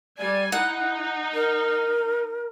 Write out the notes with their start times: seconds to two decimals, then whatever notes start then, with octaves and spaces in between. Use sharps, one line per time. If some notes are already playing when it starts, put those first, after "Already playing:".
0.18 G3 D5 G#5
0.52 D#4 E4 F#5
1.34 A#4